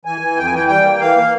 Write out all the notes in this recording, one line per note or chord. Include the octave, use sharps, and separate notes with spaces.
E3 G#5
E3
F2 G5
G#5
E3 G5
G3 G5
A#3
E3 F5
A#3